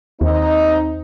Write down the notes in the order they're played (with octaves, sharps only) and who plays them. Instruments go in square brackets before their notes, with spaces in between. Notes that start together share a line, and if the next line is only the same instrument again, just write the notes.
[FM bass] D#2 [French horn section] C4 D#4